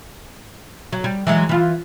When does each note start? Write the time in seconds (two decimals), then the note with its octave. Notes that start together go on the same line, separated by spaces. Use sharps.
0.92 F#3
1.04 G3
1.27 E3 F#3 G#3
1.49 E3 F4